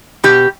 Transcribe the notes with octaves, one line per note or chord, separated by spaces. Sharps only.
B2 G4